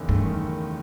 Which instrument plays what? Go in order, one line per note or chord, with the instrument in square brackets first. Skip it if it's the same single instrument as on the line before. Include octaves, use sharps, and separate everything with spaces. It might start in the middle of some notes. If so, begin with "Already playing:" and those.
Already playing: [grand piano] F#1 E2 D#3
[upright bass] G2 [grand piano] A3
[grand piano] D#3